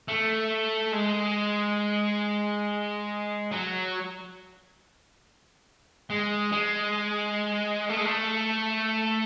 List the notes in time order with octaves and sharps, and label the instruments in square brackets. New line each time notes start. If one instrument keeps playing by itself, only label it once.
[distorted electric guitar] A3
G#3
F#3
G#3
G#3
A3
G#3
A3